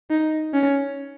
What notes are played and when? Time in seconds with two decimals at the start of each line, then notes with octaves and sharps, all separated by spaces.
0.10 D#4
0.54 C#4